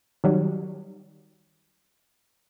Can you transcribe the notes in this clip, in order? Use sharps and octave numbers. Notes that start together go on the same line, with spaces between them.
D#3 F#3 G3